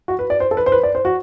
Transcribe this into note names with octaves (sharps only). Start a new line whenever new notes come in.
F#4
B4
D5
C5
A4
B4
C5
B4
D5
C5
F#4